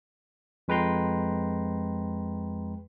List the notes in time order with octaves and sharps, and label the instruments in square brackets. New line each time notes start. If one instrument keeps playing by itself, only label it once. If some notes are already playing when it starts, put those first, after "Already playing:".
[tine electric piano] F2 G#3 B4 G5 A#5 C6